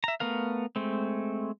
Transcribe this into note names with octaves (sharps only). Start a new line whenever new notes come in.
E5 A#5
A3 B3 A#4 F5
G#3 A3 C4